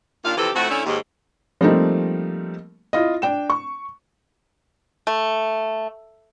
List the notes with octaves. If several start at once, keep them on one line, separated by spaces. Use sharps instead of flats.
D#2 A#2 D4 F4 F5
C3 E3 F3 C4 G4 A4
F2 A2 A3 C4 F#4
D3 A3 C#4 E4
D#2 G#2
F3 G3 A3 A#3 C4 D#4
E4 F4 D#5
D4 G5 E7
C#6
A3